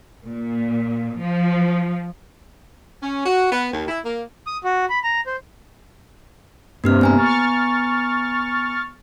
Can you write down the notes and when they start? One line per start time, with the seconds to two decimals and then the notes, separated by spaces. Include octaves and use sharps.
0.25 A#2
1.20 F3
3.02 C#4
3.25 F#4
3.52 B3
3.73 D#2
3.88 E4
4.05 A#3
4.47 D#6
4.64 F#4
4.90 B5
5.04 A#5
5.27 C5
6.84 G2 C3 A#3 G4 F6
7.01 B3 G#5 A#5
7.17 C#6 F6 A6